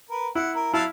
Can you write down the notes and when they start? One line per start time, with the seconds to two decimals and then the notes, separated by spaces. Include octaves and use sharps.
0.10 A#4 B4
0.35 E4 F#5
0.55 A#4
0.74 F#3 E4 F5 A5